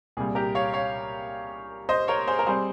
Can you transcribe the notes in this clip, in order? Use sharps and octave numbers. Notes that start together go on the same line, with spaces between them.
C2 A#2 G3 G#4
G4 A#4
C#5 F5
C#5 F5
C5 D#5
A#4 C#5
G#4 C5
A#4
G3 C4 G#4 C5